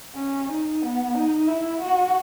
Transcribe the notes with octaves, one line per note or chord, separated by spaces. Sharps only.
C#4
D#4
B3
D#4
E4
F#4